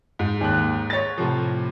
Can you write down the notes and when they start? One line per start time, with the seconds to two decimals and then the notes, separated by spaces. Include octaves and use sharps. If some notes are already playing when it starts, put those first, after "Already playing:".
0.19 G#2
0.41 D#2 F#6
0.90 C#5 A6
1.18 A2 C3 F3